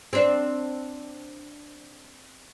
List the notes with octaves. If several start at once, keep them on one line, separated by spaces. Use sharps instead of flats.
C4 D4